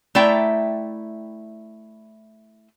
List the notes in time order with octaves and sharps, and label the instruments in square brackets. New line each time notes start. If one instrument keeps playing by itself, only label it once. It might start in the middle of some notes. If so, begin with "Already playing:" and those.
[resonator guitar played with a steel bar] A3 E4 D5 E5 G5 A#5